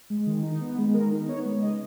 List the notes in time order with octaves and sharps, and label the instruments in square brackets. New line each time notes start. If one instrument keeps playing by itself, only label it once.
[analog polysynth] G#3
D#3
D#4
B3
G#3
D#3 A#4
D#4
B3 C#5
G#3
C#3 D#5